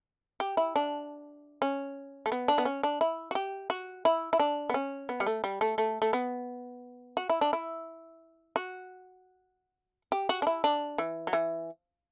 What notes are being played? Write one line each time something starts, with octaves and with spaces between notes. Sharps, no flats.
G4
E4
D4
C#4
A3
B3
D4
B3
C#4
D4
E4
F#4
G4
F#4
E4
E4
D4
B3
C#4
B3
G3
A3
G3
A3
A3
A3
B3
F#4
E4
D4
E4
F#4
G4
F#4
D4
E4
D4
E3
F#3
E3